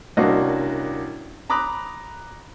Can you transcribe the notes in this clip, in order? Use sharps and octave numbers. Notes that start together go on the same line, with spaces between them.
C2 A#3 C#4 D4 F#4 D#5
A#5 B5 D6 D#6 F#6